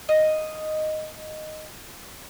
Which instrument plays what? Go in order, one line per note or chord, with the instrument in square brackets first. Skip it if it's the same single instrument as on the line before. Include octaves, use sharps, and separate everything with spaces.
[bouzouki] D#5 F5